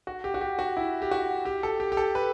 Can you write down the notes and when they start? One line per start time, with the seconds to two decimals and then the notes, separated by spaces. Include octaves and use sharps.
0.07 F#4
0.24 G4
0.34 F#4
0.41 G4
0.59 F#4
0.77 E4
1.02 G4
1.11 F#4
1.45 G4
1.63 A4
1.80 G4
1.92 G4
1.97 A4
2.15 B4